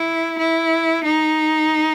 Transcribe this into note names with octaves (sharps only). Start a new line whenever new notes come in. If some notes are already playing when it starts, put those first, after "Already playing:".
Already playing: E4
E4
D#4